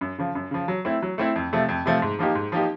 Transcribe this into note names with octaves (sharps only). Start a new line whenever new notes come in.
F#2
C#3 F3
F#2
C#3 F3
F#3
A3 C4 E4
F#3
A3 C4 E4
F2
C3 F3 A3
F2
C3 F3 A3
G#2
F3 A#3 D#4 G4
G#2
F3 A#3 D#4 G4